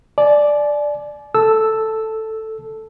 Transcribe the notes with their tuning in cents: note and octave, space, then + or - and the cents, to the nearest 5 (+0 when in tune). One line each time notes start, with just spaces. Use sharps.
D5 +0 G#5 +40
A4 +0 A5 +0 E6 +0